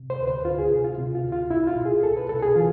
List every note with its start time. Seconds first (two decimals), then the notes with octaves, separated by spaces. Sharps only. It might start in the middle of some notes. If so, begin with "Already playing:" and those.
Already playing: C3
0.10 C5
0.19 D2 B4
0.27 C5
0.45 D2 F4
0.59 G#4
0.71 C3
0.84 F4
0.98 C3
1.15 F4
1.24 D2
1.32 F4
1.50 C2 E4
1.67 F4
1.76 B2
1.85 G#4
2.03 C2 A4
2.17 B4
2.29 C2 A4
2.42 G#4
2.55 E3 F4